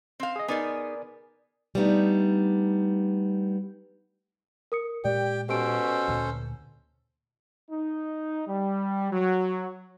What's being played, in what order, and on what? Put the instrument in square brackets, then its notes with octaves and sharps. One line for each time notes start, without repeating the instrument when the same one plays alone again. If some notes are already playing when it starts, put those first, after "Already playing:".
[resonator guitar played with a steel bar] C4 F5
[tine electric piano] G#4 D#5
[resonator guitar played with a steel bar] B3 D#4 G#4 [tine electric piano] A#4 D5 G#5
[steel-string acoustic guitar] G3 A3 B3 D4 D#4
[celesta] A#4 D#6 C#7
[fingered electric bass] A#2 G#3 [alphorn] G4 [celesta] D5 [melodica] G5
[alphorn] B2 [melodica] C#4 A4 C5 [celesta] G4 D7
[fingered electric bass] D2 A#2
[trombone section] D#4
G3
F#3